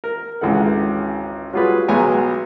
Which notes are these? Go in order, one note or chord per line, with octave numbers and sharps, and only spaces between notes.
A#4
G#1 C#2 E3 A4 F#5
F#3 G3 F4 G#4 B4
B1 G#3 B3 C#5 G#5 A#5